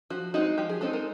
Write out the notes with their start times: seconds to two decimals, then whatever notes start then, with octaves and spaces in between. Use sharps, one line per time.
0.10 F3 F#4
0.34 G#3 C4 D#4 F#4
0.58 F3 G4
0.69 G#4
0.81 G#3 C4 D#4 A4
0.93 A#4